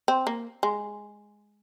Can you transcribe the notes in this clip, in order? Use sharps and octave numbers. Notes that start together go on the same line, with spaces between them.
C4
A#3
G#3